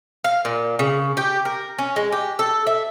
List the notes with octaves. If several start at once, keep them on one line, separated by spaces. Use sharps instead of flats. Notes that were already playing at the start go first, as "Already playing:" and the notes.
F5
A#2
C#3
G4
A#4
C#4
G#3
G4
A4
E5